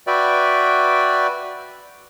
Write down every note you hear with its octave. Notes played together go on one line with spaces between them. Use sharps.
F#4 B4 D5 E5 G5